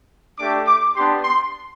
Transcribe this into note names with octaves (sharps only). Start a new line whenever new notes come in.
A3 D4 G4 D6
D6
B3 D4 G4 C6
C6